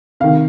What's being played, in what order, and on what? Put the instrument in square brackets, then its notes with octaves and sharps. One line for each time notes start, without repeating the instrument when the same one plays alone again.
[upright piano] C3 D#3 F5